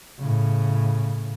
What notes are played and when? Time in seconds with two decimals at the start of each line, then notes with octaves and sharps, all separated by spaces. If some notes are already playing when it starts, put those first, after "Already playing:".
0.20 A2 C#3